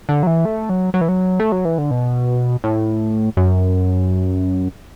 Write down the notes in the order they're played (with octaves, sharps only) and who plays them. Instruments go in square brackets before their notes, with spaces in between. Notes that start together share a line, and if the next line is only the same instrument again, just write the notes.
[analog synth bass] D3
F#3
E3
A3
F#3
F#3
E3
F#3
A3
F#3
E3
D3
B2
A2
F#2